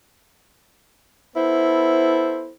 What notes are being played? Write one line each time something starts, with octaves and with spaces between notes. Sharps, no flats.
B3 E4 A4 C5